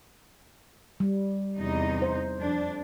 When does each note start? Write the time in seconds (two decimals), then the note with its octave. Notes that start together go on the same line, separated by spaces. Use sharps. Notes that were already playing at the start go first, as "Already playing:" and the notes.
1.00 G3
1.58 E2 C3 D#4
2.02 C5
2.39 F2 D4